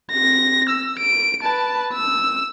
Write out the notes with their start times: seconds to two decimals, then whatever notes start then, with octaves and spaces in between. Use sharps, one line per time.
0.11 C4 A#6
0.69 E6
0.99 D7
1.43 B4 A5
1.93 E6